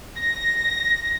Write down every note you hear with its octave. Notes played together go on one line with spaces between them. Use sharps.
A#6